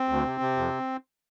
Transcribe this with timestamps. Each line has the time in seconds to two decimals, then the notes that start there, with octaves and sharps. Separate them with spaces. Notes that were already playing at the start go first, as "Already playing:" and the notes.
Already playing: C4
0.09 D2
0.25 C3
0.41 C3
0.57 F2